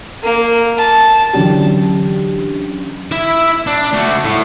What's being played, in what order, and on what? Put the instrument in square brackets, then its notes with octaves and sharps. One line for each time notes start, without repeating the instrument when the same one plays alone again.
[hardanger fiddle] A#3
A5
[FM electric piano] D3 E3 F#3 C#4 D4 G4
[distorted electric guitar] E4 E5
D4
A3 F#4
A2